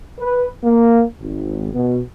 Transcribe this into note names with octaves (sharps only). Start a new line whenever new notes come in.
B4
A#3
G#1
B2